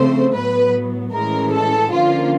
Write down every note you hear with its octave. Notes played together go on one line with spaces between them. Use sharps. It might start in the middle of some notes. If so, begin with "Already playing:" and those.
Already playing: C#3 F3 A3 C4 C5
A2 F#3 B3 B4
A2 E3 G#3 C#4 A#4
A4
D3 F3 A#3 C#4 F4